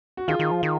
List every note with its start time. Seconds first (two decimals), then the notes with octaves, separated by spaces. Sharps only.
0.17 F#4
0.28 D#3 F4 G#4
0.39 D#3
0.51 F3
0.63 D#3